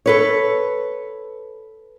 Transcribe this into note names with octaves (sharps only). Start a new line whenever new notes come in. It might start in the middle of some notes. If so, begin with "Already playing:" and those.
A4 B4 C#5